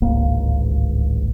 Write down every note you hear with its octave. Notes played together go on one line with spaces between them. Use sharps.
D1 G#1 C#2 A#3